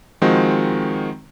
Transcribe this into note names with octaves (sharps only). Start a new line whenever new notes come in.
D#3 F3 G#3 C4 F#4